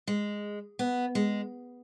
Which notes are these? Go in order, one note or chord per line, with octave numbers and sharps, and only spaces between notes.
G#3
B3
G#3